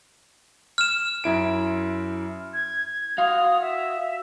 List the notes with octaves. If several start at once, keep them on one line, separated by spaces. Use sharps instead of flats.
F6 E7
F#2 E4 D7
G#6
F#4 F5 D#6
E5